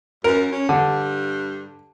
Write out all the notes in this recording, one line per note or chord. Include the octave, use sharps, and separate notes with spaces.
F#2 A#4
C#4
G2 D3